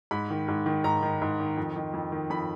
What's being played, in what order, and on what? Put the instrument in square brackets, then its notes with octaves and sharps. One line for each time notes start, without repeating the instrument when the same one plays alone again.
[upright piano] G#2 B5
D#3
G#2
D#3
G#2 A#5
D#3
G#2
D#3
F2
D#3
F2
D#3
F2 B5